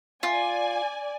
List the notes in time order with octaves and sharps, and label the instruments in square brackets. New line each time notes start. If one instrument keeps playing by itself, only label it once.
[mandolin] F4 [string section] D5 G#5